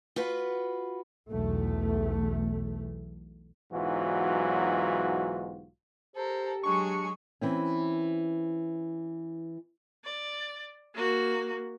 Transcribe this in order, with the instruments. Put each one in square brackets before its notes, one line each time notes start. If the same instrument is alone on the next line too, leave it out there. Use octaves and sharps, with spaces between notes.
[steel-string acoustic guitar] F4 F#4 B4
[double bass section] B1 E2 A3
[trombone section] B1 G#2 E3 F#3 F4 F#4
[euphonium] G4 [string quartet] A4 A#4 [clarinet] C5
[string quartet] F#3 G#3 G#5 [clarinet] D4 [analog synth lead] C#6
[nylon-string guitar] E3 C4 C#4
[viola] D5
A#3 F#4